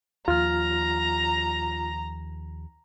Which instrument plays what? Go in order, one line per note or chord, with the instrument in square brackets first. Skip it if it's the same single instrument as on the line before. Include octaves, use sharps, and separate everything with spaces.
[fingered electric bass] D#2 F3 [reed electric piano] F4 F6 [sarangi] A#5